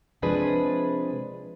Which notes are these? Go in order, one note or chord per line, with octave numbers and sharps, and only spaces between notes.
C3 F3 G#3 D4 G#4 B4